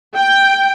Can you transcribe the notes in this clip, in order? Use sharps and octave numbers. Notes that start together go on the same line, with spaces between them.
G5